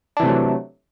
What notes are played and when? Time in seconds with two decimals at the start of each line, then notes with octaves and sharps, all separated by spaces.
0.17 D4
0.20 E3
0.23 C3
0.26 A3
0.29 F#3